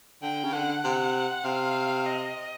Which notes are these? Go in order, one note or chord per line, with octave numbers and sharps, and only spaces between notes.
D3 G5
C#3
D3 F#5
C3
C3 F5
D#5